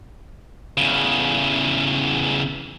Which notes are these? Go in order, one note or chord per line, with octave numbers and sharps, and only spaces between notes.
E2 C#3